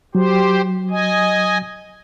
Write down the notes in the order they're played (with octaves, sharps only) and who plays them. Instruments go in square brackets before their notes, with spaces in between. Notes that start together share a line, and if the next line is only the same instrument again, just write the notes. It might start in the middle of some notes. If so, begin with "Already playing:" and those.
[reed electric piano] F#3 [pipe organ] G4 C5
[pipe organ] D#5 G#5